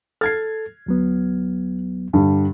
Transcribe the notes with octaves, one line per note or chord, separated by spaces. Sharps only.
A4 F6 G#6 A6 C7
D2 F#3 B3
G2 D3 G3